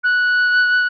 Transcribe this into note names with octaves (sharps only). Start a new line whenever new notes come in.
F#6